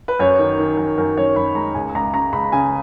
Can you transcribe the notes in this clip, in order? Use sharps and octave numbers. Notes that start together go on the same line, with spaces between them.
B4
F#2 C#5
D#3
D#3
F#2
F#2 A#4
F#2 C#5
F#2 B5
G#3 A#5
C#2 G#5
C#2 A#5
C#3 A#5
C#2 B5
C#3 G#5